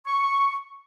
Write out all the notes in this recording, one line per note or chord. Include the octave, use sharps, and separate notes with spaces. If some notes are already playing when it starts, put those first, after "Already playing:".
C#6